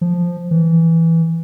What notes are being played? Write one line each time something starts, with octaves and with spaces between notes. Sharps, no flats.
F3
E3